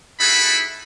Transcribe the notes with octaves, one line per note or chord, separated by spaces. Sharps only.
D#4 E4 F#4 G#4 A4 B5